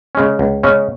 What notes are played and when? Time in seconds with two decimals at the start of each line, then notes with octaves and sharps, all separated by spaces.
0.15 C#3 G#3 C#4
0.39 C#2
0.63 C#3 G#3 C#4